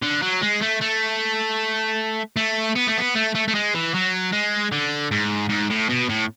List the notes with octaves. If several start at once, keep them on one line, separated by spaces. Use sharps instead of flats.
D3
F#3
G#3
A3
A3
A3
B3
A3
B3
A3
A3
A3
G#3
E3
F#3
G#3
D3
G#2
G#2
A2
B2
A2